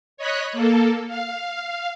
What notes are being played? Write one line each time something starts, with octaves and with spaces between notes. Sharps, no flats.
C#5 D#5 B5 F#6
A#3 A4
F5